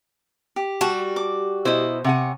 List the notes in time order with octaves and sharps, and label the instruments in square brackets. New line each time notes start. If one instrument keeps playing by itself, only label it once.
[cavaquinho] G4
[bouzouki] G3 F#4 [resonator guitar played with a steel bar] A5
[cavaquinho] D6
[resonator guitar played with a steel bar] B2 C5 [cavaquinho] E4 D#5
[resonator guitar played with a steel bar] C3 F#5 G#5 [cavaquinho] C#5